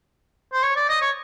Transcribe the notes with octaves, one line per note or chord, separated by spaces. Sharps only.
C5
C#5
D5
D#5
C#5